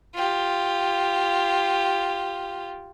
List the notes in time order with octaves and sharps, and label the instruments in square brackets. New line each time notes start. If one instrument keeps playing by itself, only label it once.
[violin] F4 G4